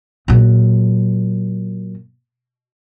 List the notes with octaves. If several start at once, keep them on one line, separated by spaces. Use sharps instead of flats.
A#2 F#3